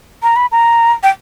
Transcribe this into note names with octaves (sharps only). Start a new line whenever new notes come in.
A#5
B5
A#5
G5